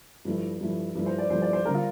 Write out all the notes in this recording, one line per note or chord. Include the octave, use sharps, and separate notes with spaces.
G2 F3 A3 E4
G2 F3 A3 E4
G2 F3 A3 E4
C5
D5
G2 F3 A3 E4 C5
D5
C5
D3 G3 D4 A#4
F4